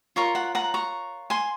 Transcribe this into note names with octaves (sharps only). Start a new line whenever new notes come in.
F4 A#4 C#5 A#5 C#6
F#5 A#5
F#5 A#5
A#5 C#6
G#5 C6